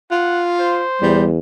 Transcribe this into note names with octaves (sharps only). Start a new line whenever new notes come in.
F4 F#5
C5
E2 G3